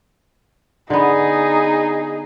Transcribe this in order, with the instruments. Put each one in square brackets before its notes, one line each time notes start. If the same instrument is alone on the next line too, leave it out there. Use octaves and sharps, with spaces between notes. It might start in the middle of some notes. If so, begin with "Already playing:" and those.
[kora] D3 B3 [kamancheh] D#4 G#4